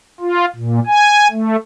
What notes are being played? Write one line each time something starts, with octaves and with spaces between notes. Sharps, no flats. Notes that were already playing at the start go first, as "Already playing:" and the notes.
F4
A#2
G#5
A3